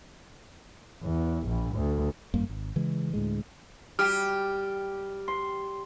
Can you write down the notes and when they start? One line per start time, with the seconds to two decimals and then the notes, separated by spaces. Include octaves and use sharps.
1.04 E2
1.47 A#1
1.75 D2
2.34 G#1 F#2 G3 A#3
2.49 G#1
2.76 C#3 E3 G#3
3.13 D2 A2 G#3
3.99 G3 G4 F6
5.28 C6